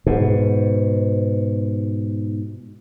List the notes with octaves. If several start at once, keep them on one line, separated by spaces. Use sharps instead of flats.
G#2 B2